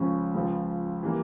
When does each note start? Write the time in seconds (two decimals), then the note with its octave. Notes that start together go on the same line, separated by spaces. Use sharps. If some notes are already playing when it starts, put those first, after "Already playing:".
Already playing: C#2 C#3 F3 C#4
0.34 C#2 C#3 F3
1.03 E3 G3 A#3